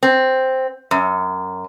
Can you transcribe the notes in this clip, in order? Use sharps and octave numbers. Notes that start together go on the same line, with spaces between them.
C4
F#2